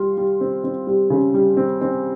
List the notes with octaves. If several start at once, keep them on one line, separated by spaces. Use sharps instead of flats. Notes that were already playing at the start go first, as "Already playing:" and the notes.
Already playing: G3 F4
G3
C4
C4
G3
C#3
G3
C4
C4